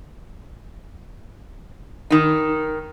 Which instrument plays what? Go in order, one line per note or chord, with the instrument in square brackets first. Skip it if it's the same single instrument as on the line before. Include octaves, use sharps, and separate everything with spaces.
[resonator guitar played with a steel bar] D#3 D#4